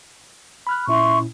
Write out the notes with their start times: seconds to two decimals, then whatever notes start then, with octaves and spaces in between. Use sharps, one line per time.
0.67 B5 F6 F#6
0.88 A#2 C#4 E4 E5 C6 C#6